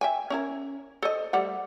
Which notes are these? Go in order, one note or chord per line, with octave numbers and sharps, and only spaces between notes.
E5 G5 G#5
C#4 E4 A#4
A4 C5 D#5
G3 A3 F#5